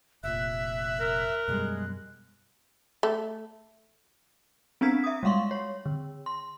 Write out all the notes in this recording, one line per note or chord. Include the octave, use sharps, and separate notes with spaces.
F1 A#2 E5 F#6
A#4
F#2 B2 G3 G#3
A3
B3 C4 D4 A#5 G#6 B6
E5 D#6
G3 G#3 F5 C6 C#6
C#5
D3
C6